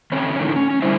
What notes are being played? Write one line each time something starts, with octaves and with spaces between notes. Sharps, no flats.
D#3 C4 C#4 C#5
E2 A2 D3 D#3
C#4
C#4
D3 G3 E4 C5 E5